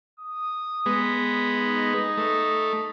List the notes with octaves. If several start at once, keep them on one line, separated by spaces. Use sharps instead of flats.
D#6
G#3 B3
D#4
A3